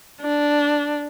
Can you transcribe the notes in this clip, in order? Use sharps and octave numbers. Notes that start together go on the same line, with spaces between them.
D4